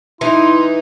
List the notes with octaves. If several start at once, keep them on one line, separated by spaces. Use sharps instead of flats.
E3 D#4 E4 C6